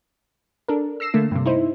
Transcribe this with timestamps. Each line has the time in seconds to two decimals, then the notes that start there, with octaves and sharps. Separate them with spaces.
0.68 D4 A4 A#4
1.00 E6 A#6 C7 E7
1.14 D3 A3 A#3
1.31 G2 C3
1.46 D#4 E4 C5